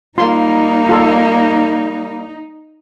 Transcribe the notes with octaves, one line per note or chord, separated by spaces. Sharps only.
G3 A#3 D#4 F4 C6
F4 A4